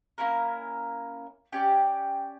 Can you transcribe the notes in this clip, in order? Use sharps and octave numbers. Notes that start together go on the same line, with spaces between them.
A#3 C#4 E4 A#4
C#4 G4 D5 G5